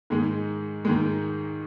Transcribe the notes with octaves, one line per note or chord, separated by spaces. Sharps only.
G#2 D#3 G#3
G#2 D#3 G#3